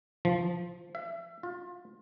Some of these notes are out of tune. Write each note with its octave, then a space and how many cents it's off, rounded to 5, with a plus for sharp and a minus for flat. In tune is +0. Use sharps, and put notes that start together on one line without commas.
F3 -5
E5 +30
F4 +25